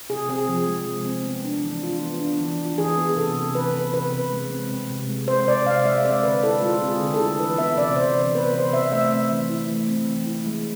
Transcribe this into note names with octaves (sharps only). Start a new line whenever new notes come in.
C3 G#4
C4 G#4
F3
G#3
C3
C4
B3
D4
E3
F4
B3
D4
E3
F4
E3 G#4
B3
C3 A4
C3
E3 B4
B3
C3 B4
C3
G#3
C4
C3
C3
G#3
C4 C5
C5
C3 D5
C3 F5
G#3 E5
C4 D5
D3 B4
E4 A4
G#3 F4
C4
G#4
D3
A4
E4
E3 B4
B3 E5
C3 D5
C3 C5
E3
B3 B4
C3 C5
C3 E5
A3 E5
C4
E3
E4
A3
C4
E3
E4
G#3